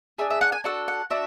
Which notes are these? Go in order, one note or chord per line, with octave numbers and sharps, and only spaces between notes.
D4 G#4 E5
E5
F#5
G#5
D4 F#4 A4 F#5
F#5
D4 F#4 E5